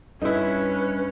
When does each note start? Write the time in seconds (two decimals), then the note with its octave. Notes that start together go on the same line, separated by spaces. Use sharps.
0.22 G2 C#4 D#4 E4 B4